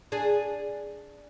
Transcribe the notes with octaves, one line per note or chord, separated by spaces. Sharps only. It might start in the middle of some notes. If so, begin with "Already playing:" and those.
D4 G#4